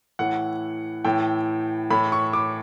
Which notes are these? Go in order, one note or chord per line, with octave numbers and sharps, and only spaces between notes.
A2 E3 F#5
A2 E3 G5
A2 E3 B5
C#6
D6